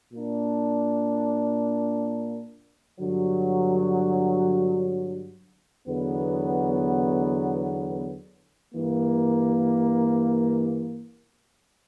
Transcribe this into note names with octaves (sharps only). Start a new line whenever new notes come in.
A#2 A#3 D4
G2 D3 F#3
E2 D3 F#3 B3
G2 E3 A#3